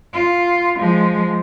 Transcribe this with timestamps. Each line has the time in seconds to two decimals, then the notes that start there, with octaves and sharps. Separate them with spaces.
0.13 F4
0.78 F3 G#3